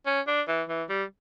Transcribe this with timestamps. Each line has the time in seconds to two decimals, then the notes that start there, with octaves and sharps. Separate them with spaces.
0.06 C#4
0.27 D4
0.48 E3
0.69 E3
0.89 G3